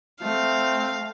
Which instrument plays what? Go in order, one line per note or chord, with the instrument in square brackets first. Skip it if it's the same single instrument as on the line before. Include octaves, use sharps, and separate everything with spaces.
[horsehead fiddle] A3 [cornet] C4 [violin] F5